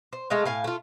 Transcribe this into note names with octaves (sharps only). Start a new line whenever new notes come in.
C5
G#3 A3 D#5 F5
A2 F5 G#5
A3 F4